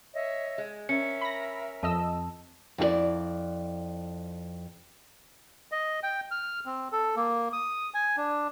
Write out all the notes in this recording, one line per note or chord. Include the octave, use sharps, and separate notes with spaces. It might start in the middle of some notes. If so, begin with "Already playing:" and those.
C#5 D#5 E5
G#3
C#4 A#4 E5 C#7
B5 A#6
F2 D#5 A5 E6
F2 E4 G#4 D5
D#5
G5
F6
C4
A4
A#3
D#6
G#5
D4